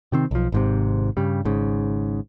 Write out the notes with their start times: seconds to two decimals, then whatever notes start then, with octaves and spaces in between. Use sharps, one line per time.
0.12 C3 D#3 C4
0.31 B1 F3
0.52 G#1 G#2 C3
1.17 G2 C#3 G3
1.45 G#1 G#2 C#3